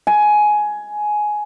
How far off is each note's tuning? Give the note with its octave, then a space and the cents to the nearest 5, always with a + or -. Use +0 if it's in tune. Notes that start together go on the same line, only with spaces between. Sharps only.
G#5 +15